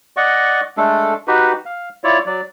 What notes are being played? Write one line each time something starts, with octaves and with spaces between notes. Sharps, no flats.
D5 D#5 F#5 C#6
G#3 A3 D4 A4
D#4 F#4 G4 B4
F5
E4 F4 C#5 D5
F#3 D5